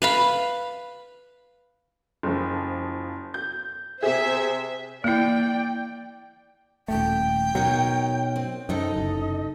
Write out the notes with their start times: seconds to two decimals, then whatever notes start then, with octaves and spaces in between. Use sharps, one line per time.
0.02 B4 F5 B5
2.23 F#1 F3
3.34 G6
4.03 C3 G#4 C5 E5
5.04 A#3 E4 D5 G5
6.88 D#1 F2 A3 G5
7.55 B2 F#3 D#4 A#4 C#5
8.36 C4
8.69 F#2 C3 D#4 A4 D#5
8.96 F#1